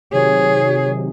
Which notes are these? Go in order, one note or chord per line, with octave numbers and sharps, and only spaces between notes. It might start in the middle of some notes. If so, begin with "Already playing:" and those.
C3 D#3 F#3 G#4 C#5